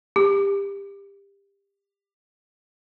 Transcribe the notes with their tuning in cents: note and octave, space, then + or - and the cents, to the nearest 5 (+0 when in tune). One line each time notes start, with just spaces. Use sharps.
G4 +25